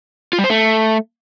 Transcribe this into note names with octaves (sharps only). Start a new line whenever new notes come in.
F4
G3
C5
A3